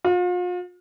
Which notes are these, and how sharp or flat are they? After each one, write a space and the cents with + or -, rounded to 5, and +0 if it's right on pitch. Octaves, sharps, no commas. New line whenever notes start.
F4 +40